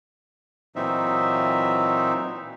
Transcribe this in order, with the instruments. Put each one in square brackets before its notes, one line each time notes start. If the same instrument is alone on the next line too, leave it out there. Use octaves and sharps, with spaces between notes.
[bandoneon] A#2 E3 F#3 C4 D#4 E5